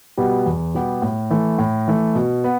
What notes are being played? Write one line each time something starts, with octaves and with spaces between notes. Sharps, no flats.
B2 G3 B3 G4
E2
B2 G3 B3 G4
A2
E3 A3
A2
E3 A3
B2
B3